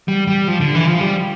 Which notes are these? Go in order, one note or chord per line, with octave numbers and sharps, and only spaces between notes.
G3
G3
F3
D3
E3
F3
G3